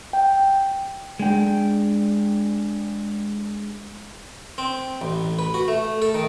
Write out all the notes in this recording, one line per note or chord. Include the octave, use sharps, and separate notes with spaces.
G5
G#3 D4 G5
C4
A1
B4
F#4
A3
A4
D#3